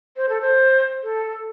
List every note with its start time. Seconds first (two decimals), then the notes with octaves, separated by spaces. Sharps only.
0.17 C5
0.29 A4
0.41 C5
1.03 A4